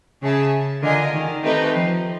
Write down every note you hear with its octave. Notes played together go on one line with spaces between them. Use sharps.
C#3 G#4 C#5 E5 A5
D3 F4 A#4 D#5 G#5
D#3
A3 C4 D#4 G4 B4
F3